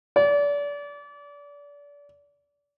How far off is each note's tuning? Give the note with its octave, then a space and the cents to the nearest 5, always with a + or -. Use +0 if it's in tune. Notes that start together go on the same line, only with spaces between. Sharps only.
D5 -30